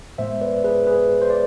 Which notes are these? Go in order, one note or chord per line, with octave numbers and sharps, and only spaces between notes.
A2 G#3 B3 C5 E5
B4 D5
G#4 B4
G#4 B4
C5
D5